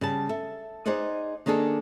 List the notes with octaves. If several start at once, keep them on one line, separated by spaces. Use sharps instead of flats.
C#3 G3 A5
A4 E5
D#4 G#4 C5 D5 D#5 F#5
D#3 A#3 D4 G#4 A4